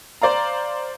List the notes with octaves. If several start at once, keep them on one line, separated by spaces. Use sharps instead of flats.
C5 D5 F5 A#5